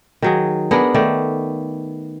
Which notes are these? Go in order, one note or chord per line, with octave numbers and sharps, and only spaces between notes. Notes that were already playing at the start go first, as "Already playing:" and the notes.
D#3 F#3 G#4
B3 D4 G#4 A#4
D#3 A3 D5